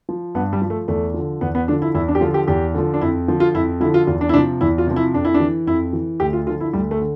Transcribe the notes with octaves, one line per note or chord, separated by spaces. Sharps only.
F3
G2 B3
G3
F3
A3
E2 A3
D3 F3
E2 B3
B3
D3 F3 D4
E4
E2 E4
D4
G4
D3 F3 F4
G4
E2 G4
D3 F3
D4
F2 E4
D3 F3
F4
F2 E4
D3 F3 E4
F4
E2 F4
D4
E4
C3 F3 D4
E2 E4
F4
C3 F3
E4
F2 D4
E4
D4
E3
F2 E4
E3
D2 G4
F4
D3 F3 F4
E4
D2 G3
A3
D3